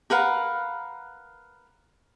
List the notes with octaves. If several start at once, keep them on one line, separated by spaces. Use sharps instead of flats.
A#4 B4 F5 F#5